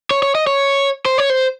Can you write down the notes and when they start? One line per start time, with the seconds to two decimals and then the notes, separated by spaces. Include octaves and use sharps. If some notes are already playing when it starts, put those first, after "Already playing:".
0.11 C#5
0.22 C#5
0.35 D#5
0.47 C#5
1.05 C5
1.18 C#5
1.30 C5